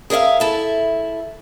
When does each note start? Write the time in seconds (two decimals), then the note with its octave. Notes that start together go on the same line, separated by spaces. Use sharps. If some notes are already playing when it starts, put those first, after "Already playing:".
0.10 G#4 A#4 C#5 E5 F5
0.40 E4 A4 E5